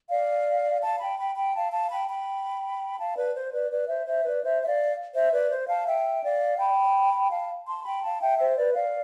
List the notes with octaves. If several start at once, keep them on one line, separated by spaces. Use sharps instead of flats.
D5 F5
F5 A5
G5 B5
G5 B5
G5 B5
F5 A5
F5 A5
G5 B5
G5 B5
F5 A5
B4 D5
C5
B4 D5
B4 D5
C5 E5
C5 E5
B4 D5
C5 E5
E5
D5 F5
C5 E5
B4 D5
C5
F5 A5
E5 G5
D5 F5
G5 B5
F5 A5
A5 C6
G5 B5
F5 A5
E5 G5
C5 E5
B4 D5
D5 F5